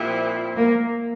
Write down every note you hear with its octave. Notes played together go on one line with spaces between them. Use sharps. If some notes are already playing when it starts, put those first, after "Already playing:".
Already playing: A#2 F3 C4 E4 G4
A#3